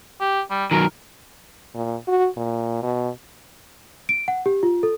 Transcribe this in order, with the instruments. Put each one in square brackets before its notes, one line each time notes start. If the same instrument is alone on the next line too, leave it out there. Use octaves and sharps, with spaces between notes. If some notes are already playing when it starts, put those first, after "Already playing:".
[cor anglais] G4
G3
[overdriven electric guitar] D#3 F#3 [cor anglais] A#4
[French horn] A#2
F#4
A#2
B2
[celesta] D7
F#5
G4
F4
A4